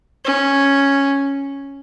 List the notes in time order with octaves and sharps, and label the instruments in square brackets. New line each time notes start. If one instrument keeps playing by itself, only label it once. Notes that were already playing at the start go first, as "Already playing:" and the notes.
[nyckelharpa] C#4